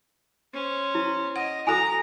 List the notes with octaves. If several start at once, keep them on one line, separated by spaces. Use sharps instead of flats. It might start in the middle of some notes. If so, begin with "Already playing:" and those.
C#4 C5
E4
D#5 F#5
E4 F#4 A4 G#5 A#5 D#6